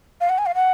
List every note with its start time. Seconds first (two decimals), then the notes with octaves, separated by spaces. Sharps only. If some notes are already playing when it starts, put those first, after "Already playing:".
0.20 F5
0.29 F#5
0.38 G#5
0.46 F5
0.55 F#5